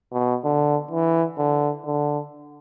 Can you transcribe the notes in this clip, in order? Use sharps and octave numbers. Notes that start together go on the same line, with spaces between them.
B2
D3
E3
D3
D3